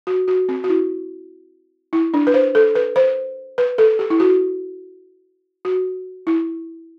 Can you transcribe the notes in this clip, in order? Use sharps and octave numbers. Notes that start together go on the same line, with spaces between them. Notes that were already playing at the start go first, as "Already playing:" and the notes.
F#4
F#4
C4
F#4
E4
E4
D4
B4
C5
A4
B4
C5
B4
A4
G4
E4
F#4
F#4
E4